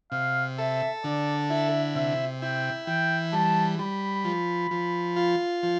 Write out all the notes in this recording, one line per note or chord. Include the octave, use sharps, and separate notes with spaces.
C3 F5
A4 E5
D3 D5
E4 E5
C3 E5
E4 G5
E3 G5
G3 A5
G3 B5
F3
F3
F4
F3